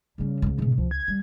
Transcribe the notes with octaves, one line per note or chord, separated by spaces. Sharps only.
C#3 G3 A#3
D1 C#2
G#2 B2
C#2 F3
G#6
G3